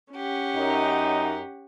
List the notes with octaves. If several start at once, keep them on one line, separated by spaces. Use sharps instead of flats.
C#4 G4 F#5
F#2 D#4